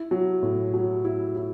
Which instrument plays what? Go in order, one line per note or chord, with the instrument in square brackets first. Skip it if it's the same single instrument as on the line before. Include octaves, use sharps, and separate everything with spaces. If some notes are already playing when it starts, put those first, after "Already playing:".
Already playing: [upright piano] E4
F#3
A2
F#3
E4
E4